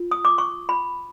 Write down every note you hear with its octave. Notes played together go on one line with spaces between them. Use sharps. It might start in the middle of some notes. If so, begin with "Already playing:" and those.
Already playing: F4
D#6
D6
C#6
B5